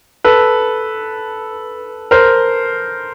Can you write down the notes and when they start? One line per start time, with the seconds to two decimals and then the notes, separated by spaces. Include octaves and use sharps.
0.24 A4 B4
2.11 A#4 C5